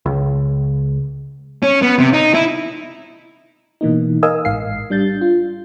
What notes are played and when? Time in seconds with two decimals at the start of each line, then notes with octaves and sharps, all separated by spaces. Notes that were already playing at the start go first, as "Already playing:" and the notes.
0.06 C#2
1.63 C#4
1.82 B3
1.99 C3
2.13 D#4
2.34 E4
3.81 B2 E3 A#3 D#4
4.23 A#4 D#5 F5 G#5 D#6 E6
4.45 A1 G#2 F5 C7
4.90 G3 D4 G6 A6
5.21 F4